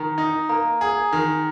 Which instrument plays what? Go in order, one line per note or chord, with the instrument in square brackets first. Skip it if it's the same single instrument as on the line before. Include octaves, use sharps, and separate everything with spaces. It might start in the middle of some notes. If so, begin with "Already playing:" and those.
Already playing: [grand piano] D#3 [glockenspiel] A#5
[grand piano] D#4
[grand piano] A#3 [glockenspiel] A#5
[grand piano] G#4
D#3